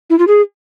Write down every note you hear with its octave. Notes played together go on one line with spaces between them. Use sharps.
E4
F4
G#4